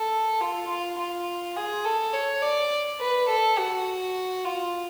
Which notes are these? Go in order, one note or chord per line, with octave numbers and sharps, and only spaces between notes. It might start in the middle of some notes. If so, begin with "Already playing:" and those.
Already playing: A4
F4
F4
F4
G#4
A4
C#5
D5
B4
A4
F#4
F4